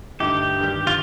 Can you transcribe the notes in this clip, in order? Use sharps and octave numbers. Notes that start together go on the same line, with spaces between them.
G2 D3 A3 D#4 G4
G2 D#3 G3
F4